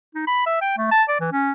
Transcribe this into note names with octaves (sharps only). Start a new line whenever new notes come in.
D#4
B5
E5
G5
A3
A5
D5
E3
C#4